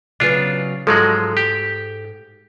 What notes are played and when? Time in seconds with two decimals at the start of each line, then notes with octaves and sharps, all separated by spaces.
0.20 C#3 F#3 B3 D4 F4
0.87 G#2 F3 F#3 G#3 A4 F5
1.37 G4